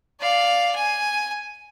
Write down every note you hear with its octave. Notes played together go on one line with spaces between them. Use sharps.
D5 F5
G#5